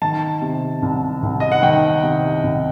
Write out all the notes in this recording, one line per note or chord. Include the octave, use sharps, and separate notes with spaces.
D#3 A5
C3
C2
C2
D#5
F#5
D#3 G5
C3
C2